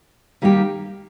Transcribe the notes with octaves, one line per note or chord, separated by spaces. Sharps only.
D#3 G3 A#3 D#4 G4